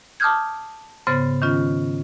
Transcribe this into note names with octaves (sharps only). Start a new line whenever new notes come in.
A5 D6 D#6 F6 G6 G#6
G#2 C#3 B3 C5 A6
D#3 C#4 F4